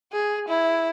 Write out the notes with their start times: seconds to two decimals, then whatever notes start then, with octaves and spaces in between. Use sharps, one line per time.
0.13 G#4
0.48 E4